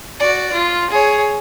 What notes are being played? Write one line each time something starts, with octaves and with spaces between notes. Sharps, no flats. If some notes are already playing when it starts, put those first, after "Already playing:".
F#4 D5
F4
G#4 C#5